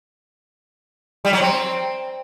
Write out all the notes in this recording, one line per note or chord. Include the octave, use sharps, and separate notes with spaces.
G3
F#3
C4